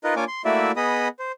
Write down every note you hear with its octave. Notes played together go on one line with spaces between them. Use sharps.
D#4 F4 A#4 B4 D#5
A#3 D4 F4 C#5 G#5 D6
C6
A3 A#3 E4 F#4 D5 E5
B3 G#4 D#5 B5 D#6
C5